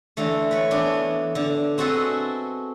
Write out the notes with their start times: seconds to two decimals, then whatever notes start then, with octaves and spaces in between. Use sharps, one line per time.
0.17 D3 E3 A3
0.51 B4 C#5 B5
0.71 E3 B3 D4
1.35 D3
1.78 C4 F#4 G#4 A4 B4 D#5